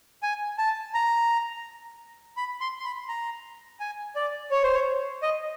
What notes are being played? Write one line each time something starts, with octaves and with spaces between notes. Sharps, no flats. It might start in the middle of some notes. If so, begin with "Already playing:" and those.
G#5
A5
A#5
B5
C6
C6
B5
A#5
G#5
D5
C#5
C5
C#5
D#5